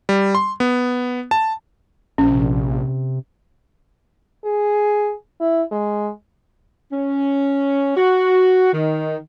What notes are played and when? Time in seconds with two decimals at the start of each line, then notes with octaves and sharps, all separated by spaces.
0.09 G3
0.35 C6
0.60 B3
1.31 A5
2.18 A#1 C#4
2.31 C3
4.45 G#4
5.40 E4
5.72 G#3
6.93 C#4
7.96 F#4
8.73 D#3